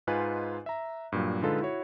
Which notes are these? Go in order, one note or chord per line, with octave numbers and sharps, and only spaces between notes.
G#2 D#4 F4 B4 G#5 F#6
E5 A#5
G2 A#2 F#3
D3 G#3 D#4 F4 A4 B4
E4 F#4 C#5